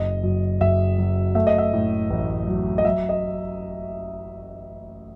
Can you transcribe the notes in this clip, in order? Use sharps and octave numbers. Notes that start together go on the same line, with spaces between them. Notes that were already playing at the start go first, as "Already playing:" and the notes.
Already playing: F#1 D#5
F#2
F#1 E5
F#3
A3 E5
D#5
E5
A2
A1
F#3
D#5
F#3 E5
D#5